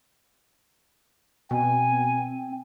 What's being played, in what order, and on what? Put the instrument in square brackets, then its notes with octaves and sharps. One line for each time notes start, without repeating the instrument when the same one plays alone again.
[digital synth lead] B2 [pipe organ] C4 [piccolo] G#5